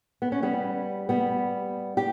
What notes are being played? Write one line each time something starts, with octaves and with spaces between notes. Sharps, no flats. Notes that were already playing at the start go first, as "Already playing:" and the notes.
B3
C#4
G3 B3
G3 B3
G4